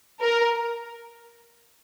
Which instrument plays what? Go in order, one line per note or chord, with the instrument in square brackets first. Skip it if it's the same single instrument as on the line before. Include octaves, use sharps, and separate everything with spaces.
[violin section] A#4